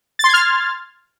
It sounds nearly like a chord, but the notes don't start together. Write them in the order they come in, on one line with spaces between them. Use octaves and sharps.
A6 C6 G#6 F6